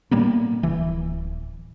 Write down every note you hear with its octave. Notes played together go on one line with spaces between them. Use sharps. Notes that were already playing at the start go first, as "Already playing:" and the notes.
A2 G3 A#3 B3
D1 E3